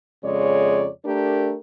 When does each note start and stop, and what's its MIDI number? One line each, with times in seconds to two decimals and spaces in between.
0.23 0.87 41
0.23 0.87 49
0.23 0.87 56
0.23 0.87 73
0.23 0.87 74
1.05 1.56 57
1.05 1.56 62
1.05 1.56 67
1.05 1.56 70